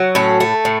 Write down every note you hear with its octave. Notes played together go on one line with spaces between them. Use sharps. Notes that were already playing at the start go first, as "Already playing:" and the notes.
Already playing: F#3
A2 C#4
A3
A2